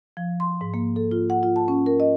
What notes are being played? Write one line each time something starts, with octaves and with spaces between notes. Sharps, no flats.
F3
C6
G#2
A#3
A4
F4
F#5
F4
A5
C#4
A#4
D#5